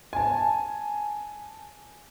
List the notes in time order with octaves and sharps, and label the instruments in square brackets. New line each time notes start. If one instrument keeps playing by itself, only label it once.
[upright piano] G#5 A5